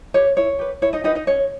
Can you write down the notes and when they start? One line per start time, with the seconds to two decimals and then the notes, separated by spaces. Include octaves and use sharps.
0.14 G4 B4 C#5
0.37 E4 C#5
0.59 G4 B4
0.82 E4 C#5
0.93 D#4 D#5
1.04 D#4 G4 B4 D#5
1.15 D#4 D#5
1.27 C#4 C#5